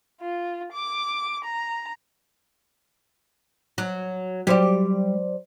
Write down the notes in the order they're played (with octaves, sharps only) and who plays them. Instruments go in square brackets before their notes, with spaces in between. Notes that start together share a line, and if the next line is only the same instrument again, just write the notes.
[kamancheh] F4
D6
A#5
[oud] F#3
[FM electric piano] F#3 C5 D5 [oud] G3 G4